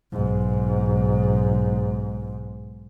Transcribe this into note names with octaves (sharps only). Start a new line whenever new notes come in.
B1 G#2